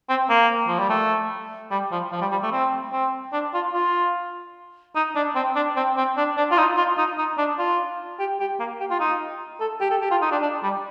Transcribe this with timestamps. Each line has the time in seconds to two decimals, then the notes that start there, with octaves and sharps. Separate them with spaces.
0.09 C4
0.29 A#3
0.68 F3
0.79 G3
0.90 A3
1.71 G3
1.92 F3
2.12 F3
2.21 G3
2.32 G3
2.43 A3
2.52 C4
2.92 C4
3.33 D4
3.54 F4
3.73 F4
4.96 D#4
5.15 D4
5.35 C4
5.55 D4
5.76 C4
5.97 C4
6.17 D4
6.37 D4
6.51 F4
6.58 D#4
6.77 F4
6.97 D#4
7.18 D#4
7.38 D4
7.59 F4
8.19 G4
8.40 G4
8.60 A#3
8.80 G4
8.91 F4
9.00 D#4
9.60 A4
9.81 G4
9.91 A4
10.02 G4
10.11 F4
10.22 D#4
10.32 D4
10.42 D4
10.63 G3